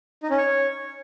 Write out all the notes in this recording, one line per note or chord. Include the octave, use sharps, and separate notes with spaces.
D#4
C#4
C#5